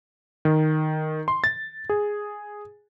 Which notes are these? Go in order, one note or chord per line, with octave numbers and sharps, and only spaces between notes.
D#3
C6
A6
G#4